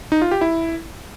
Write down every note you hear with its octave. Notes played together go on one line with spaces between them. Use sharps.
D#4
F4
G4
E4